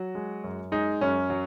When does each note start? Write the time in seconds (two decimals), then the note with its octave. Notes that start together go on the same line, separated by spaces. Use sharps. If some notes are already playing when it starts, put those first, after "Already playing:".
Already playing: F#3 F#4
0.15 G#3
0.44 F#2
0.72 G#3 D#4
1.01 F#2 C#4
1.30 F#3